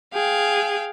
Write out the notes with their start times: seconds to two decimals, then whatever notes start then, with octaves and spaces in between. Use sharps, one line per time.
0.14 G#4 F5 G5